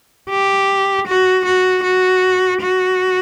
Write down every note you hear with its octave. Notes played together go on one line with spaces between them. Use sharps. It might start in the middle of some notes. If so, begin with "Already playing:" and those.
G4
F#4
F#4
F#4
F#4